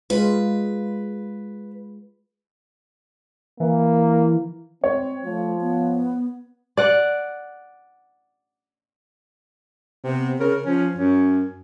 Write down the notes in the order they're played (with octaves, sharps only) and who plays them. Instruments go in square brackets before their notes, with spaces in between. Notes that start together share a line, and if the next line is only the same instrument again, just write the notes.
[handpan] G#3 F4 [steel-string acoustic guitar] B4
[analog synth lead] E3 [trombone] A#3
[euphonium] C4 [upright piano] C#5
[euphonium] F3 [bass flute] A3
[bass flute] B3
[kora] D5 F#5
[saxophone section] C3 B3
C#3 A#4
F3 C#4
F#2 C#4